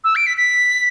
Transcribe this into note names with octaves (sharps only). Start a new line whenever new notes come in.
E6
D7
B6
B6